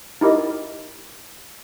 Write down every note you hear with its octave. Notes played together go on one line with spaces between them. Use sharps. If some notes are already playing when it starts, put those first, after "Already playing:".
D#4 E4 G4 A#4 D#5